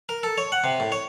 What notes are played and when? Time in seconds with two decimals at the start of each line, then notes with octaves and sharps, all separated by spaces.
0.09 A#4
0.23 A4
0.38 C#5
0.52 F#5
0.64 C3
0.80 A2
0.92 C#5